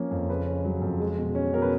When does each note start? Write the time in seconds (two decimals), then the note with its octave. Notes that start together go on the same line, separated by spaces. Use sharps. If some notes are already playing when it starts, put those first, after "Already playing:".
Already playing: F3 A#3 C#4
0.11 F2
0.29 C#3 B4
0.47 C#4
0.64 F#3
0.82 F2
1.00 G#3
1.18 B2
1.35 C#4
1.53 B2 A#4
1.62 B4